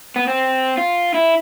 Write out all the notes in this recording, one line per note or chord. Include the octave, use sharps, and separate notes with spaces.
B3
C4
F4
E4